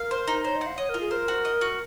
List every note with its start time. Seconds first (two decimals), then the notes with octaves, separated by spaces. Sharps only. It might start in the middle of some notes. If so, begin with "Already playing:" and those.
Already playing: A#4 F5
0.11 C5
0.27 D#4
0.44 C5 C#5
0.56 D#5
0.61 F#5
0.66 F5
0.78 C#5 D#5
0.89 F4 A#4
1.01 G#4
1.11 A#4 C5
1.28 F#4
1.45 D#5
1.61 F#4